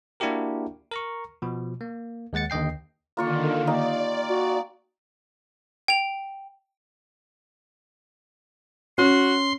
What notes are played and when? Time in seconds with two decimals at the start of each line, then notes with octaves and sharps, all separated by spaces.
0.20 A#3 D4 E4 F#4 G4 A#4
0.91 A#4 A#5 C#6
1.42 B2 F3
1.81 A#3
2.33 D#2 G#3 F#5 A6 C#7
2.50 D#2 D3 D#5 G5 C7
3.17 D3 D#3 A#3 F4 C#6
3.67 A#3 D#4 G4 D5
4.29 F#4
5.88 G5 F7
8.98 C#4 F#4 C6